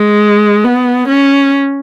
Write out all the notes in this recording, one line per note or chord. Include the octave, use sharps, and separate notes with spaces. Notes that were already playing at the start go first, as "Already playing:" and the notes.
Already playing: G#3
B3
C#4